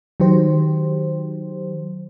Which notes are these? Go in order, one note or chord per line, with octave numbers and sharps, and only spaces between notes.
D#3 F#3 G4 C5